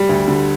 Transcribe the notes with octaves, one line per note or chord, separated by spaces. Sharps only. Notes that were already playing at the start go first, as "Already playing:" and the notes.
Already playing: G3
D2
D3